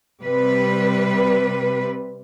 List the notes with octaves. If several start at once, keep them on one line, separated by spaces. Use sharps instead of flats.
C3 G3 B4